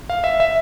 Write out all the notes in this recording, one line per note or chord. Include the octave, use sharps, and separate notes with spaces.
F5
E5
E5